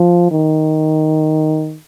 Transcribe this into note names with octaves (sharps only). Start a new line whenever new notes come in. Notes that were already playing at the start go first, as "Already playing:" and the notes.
Already playing: F3
D#3